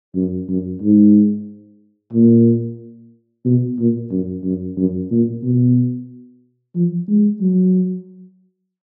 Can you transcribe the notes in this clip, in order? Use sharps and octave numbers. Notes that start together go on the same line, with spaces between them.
F#2
F#2
G#2
A#2
B2
A#2
F#2
F#2
F#2
A#2
B2
F3
G#3
F#3